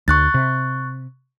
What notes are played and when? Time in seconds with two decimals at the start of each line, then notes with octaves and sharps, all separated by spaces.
0.08 D2 C#6 F#6 A6
0.34 C3